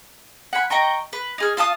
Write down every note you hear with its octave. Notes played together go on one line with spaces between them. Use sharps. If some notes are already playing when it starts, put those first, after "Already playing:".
F#5 G#5 B5
D#5 G5 A#5 C#6
B4
D#4 G#4 F6
F4 F5 A5 D#6